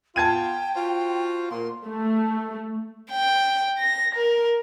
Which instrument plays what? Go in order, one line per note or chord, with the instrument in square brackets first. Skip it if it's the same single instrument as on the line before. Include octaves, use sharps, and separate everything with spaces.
[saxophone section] B3 F4 [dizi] G5 [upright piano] A5 G#6 D#7
[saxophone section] F4 F#4 C5
[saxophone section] A#2 A#3 [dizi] C6
[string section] A3
[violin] G5
A#6
A#4